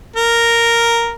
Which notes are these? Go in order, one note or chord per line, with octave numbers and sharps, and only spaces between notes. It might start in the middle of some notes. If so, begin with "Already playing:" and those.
A#4